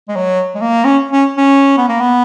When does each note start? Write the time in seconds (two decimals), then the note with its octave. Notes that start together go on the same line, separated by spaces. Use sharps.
0.09 G#3
0.16 F#3
0.55 G#3
0.61 A#3
0.84 C#4
1.12 C#4
1.37 C#4
1.78 B3
1.89 A#3
2.01 B3